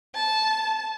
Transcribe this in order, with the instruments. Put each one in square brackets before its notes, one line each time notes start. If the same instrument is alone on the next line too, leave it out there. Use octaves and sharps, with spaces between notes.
[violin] A5